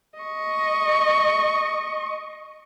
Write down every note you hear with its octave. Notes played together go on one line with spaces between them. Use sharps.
D#5 C#6